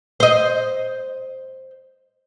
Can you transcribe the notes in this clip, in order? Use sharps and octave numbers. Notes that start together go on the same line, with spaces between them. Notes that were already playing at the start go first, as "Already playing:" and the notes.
C5 D#5